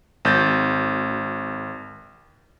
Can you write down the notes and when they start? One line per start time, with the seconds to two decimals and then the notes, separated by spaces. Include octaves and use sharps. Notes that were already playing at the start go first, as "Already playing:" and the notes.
0.25 G#1 G6 A6